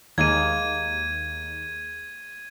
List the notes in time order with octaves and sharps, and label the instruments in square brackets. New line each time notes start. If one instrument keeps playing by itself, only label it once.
[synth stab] D#2 [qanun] G#3 A#3 [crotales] G#6 D#7